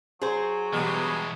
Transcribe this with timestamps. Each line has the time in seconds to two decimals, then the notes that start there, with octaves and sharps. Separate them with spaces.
0.21 F#3 G#4 C5
0.73 B2 E3 G3 G#3 B3